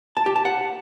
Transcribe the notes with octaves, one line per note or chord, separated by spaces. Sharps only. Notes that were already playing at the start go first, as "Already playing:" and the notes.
A5
G4
A5
F#5